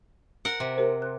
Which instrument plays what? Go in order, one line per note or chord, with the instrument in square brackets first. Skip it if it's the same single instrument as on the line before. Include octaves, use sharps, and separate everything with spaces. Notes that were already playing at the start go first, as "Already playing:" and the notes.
[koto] A#4 F#5
C3
[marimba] G4 A#4 C5
F#6